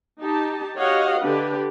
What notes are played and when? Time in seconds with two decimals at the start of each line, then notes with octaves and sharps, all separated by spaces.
0.20 D#4 G4 A5
0.78 F#4 G4 C#5 D#5 F5 F#5
1.20 D3 D4 G4 B4